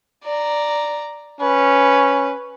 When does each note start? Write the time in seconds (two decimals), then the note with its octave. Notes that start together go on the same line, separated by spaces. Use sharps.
0.24 D5 A#5
1.41 C#4 B4